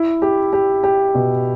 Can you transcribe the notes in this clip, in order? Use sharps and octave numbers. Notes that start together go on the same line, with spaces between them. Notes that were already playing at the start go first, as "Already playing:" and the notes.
Already playing: E4
G4
G4
G4
B2